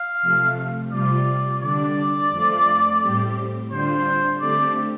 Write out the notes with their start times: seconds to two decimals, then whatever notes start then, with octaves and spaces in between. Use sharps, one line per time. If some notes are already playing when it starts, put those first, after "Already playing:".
Already playing: F5
0.22 C3 F3 A3
0.91 C3 G3 F4 D5
1.61 D3 G3 D4 D5
2.31 F2 F3 A3 F4
3.01 A2 G3 C4 G4
3.70 D3 G3 D4 F4 C5
4.40 D3 A3 C4 G4 D5